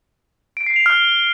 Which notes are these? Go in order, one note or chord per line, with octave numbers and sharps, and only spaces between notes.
D7
C7
F7
F6